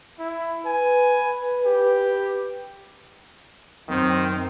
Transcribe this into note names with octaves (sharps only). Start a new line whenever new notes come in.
E4
B4 G#5
G4
F#2 D#3 C4